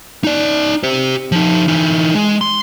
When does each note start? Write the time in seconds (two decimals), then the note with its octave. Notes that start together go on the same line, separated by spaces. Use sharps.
0.24 D#4 D5
0.83 G4 C5
1.32 F3 D#4
1.68 E3 D#4
2.15 G#3
2.41 C6